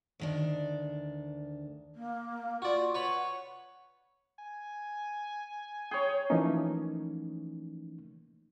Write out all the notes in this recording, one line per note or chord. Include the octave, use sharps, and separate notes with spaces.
D2 D#3 D4
A#3
F4 F#4 D5
B4 C#5 F#5 B5
G#5
G#4 C#5 G5
E3 F3 A3 A#3 C#4 D#4